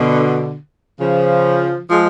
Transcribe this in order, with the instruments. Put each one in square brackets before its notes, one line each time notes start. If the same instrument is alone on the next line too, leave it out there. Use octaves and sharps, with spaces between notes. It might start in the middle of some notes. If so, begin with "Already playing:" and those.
Already playing: [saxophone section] B2 D3
C#3 F3
F3 G#3